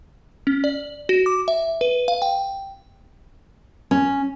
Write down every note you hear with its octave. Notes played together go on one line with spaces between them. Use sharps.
C#4
D5
F#4
D6
E5
B4
F5
G5
C#4